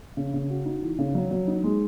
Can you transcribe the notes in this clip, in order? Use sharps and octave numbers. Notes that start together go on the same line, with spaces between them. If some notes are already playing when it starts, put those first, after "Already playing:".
C#3
C#3
F#4
D#4
E3
C#3
F#3
F#3
D#4
G#3